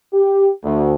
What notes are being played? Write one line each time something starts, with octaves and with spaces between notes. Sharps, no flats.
G4
D2